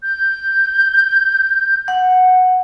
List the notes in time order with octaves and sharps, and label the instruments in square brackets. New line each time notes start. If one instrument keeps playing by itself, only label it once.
[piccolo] G6
[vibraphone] F#5